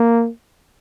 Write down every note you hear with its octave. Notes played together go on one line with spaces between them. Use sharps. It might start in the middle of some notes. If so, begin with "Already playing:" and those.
Already playing: A#3